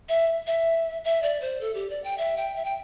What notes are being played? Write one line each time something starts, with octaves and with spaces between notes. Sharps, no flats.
E5
E5
E5
D5
C5
A4
G4
D5
G5
E5
G5
E5
G5